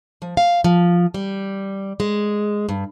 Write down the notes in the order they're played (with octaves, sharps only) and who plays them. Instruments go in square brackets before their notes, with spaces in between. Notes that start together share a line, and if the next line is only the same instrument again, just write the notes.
[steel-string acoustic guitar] F3
F5
F3
G3
G#3
G2